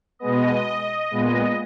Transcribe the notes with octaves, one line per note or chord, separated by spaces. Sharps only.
B2 G#3 B3 D#5
A#2 G#3 B3